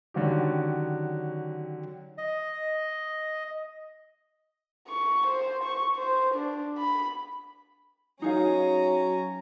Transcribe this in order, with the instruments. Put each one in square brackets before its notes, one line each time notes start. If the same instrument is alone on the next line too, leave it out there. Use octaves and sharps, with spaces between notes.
[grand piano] D3 D#3 F#3 C#4 F#4 G4
[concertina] D#5
[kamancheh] C#6
C5
C#6
C5
D4
B5
[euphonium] F#3 [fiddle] C#4 A#5 [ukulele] D#4 G#4 F5